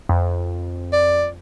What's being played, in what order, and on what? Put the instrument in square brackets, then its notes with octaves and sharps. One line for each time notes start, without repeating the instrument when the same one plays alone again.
[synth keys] F2
[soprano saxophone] D5